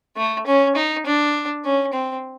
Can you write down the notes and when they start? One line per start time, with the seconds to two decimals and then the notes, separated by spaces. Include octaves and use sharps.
0.17 A3
0.47 C#4
0.76 D#4
1.06 D4
1.64 C#4
1.93 C4